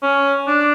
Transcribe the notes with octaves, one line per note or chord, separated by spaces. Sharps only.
C#4
D4